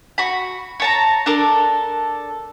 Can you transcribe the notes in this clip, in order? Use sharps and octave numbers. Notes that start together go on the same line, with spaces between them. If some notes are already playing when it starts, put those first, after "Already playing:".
F#4 B5
C#5 A5 A#5
D4 A4 A#4